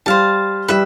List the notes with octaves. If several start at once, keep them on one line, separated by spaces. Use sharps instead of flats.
G3 C5 F5 A5
G3 B4 E5